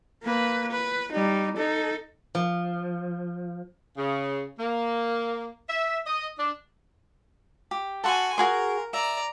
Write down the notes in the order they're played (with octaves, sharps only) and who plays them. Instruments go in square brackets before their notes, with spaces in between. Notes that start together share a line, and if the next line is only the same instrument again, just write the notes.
[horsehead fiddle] A#3 B4
B4
G3 D#4
D#4 A4
[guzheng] F3
[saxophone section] C#3
A#3
E5
D#5
D4
[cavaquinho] G4
[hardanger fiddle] F#4 G#5 [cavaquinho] A4 F#5 C6
[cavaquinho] F#4 G#4 C6 [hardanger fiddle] A#4
[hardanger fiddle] D5 A#5 [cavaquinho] E5